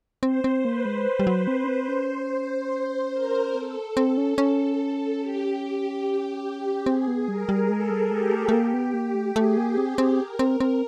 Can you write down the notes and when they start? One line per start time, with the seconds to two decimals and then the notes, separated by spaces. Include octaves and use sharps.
0.22 C4 C5
0.44 C4
0.65 A#3 B4
0.85 G#3
1.19 G3
1.27 F#3
1.47 C4
1.64 C#4
1.68 C4
1.88 C#4 C5
2.31 C5
3.13 A#4
3.55 C4 A4
3.97 C4
4.17 C#4
4.38 C#4
5.21 G4
6.86 C4 G#4
7.08 B3
7.28 G3 A#4
7.49 G3
7.70 G#3 A4
7.90 G3
8.11 G#3 G4
8.32 A3
8.49 A3
8.53 A#3
8.74 B3
8.94 A#3
9.15 A3
9.36 A3 G#4
9.57 A#3
9.77 C4
9.98 C4
10.19 A#4
10.39 C4
10.60 C4